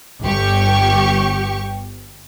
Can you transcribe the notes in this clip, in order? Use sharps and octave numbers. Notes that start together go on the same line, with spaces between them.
G1 G4 C#6